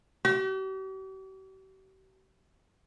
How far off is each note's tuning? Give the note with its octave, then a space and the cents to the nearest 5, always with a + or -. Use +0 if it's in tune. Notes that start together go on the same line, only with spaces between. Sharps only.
G4 -45